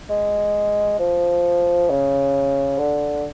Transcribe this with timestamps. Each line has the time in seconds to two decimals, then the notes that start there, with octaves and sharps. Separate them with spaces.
0.09 G#3
0.99 F3
1.90 C#3
2.78 D3